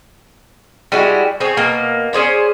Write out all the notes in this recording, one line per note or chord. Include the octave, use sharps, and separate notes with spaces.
G3 G#3 E4 F#4
C4 G#4 C#5
B2 A#3
C#4 G#4 C5 D5